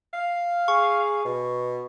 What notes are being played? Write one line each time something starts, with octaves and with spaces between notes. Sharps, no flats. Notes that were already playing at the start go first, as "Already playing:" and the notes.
F5
G#4 C#6
B2